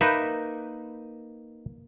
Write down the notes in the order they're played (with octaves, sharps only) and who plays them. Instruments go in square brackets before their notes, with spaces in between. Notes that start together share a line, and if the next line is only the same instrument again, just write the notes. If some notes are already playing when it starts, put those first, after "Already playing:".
[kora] A#3 [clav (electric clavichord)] D#4 B4 E5 [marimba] B5 F#6 G6